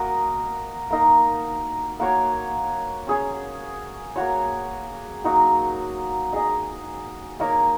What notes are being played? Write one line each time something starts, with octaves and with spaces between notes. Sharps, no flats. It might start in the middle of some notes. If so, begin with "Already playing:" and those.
Already playing: A#3 F#4 A#4 D#5
A#3 D#4 A#4 D#5
A#3 F#4 C#5
C#4 G#4 C#5
A#3 F#4 C#5
F#3 A#3 D#4 F#4
D#4 G#4 D#5
A#3 D#4 A#4 C#5